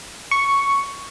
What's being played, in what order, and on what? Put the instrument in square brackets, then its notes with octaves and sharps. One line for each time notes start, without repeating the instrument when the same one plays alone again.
[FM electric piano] C#6